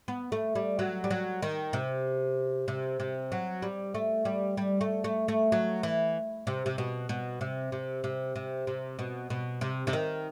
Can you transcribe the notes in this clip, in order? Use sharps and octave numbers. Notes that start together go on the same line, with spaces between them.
B3
A3
G3
F#3
G3
F#3
D#3
C3
C3
C3
F#3
G3
A3
G3
G3
A3
A3
A3
F#3
E3
C3
C3
B2
B2
C3
C3
C3
C3
C3
B2
B2
C3
C3
D#3